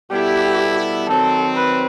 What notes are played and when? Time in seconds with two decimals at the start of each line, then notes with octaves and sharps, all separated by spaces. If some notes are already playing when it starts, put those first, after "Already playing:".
0.11 B2 G3 B3 E4 G4 A4
1.07 D#3 F#3 C4 A4
1.55 B4